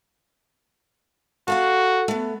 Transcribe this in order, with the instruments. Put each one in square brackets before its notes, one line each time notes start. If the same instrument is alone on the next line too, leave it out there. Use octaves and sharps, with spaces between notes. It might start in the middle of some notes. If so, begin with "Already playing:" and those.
[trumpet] F#4 [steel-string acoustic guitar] A4 F5 F#5
[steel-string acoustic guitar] A3 B3